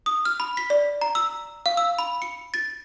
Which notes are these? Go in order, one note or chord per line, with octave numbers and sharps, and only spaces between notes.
D#6
F6
B5
B6
D5
A#5
E6
F5
E6
B5
C#7
A6